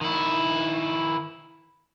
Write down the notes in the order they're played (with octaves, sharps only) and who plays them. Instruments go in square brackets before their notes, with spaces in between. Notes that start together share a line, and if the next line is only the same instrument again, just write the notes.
[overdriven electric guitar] D#3 E4